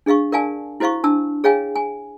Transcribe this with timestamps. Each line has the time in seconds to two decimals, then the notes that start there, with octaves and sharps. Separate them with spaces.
0.06 D4 G#4 D#5 F5 C#6
0.32 A#4 D5 F5 G#5 A5
0.80 E4 F#4 C5 D#5 F5 C#6
1.04 D4 A5 E6
1.44 G#4 C#5 D#5 F5 G5 G#5
1.76 G#5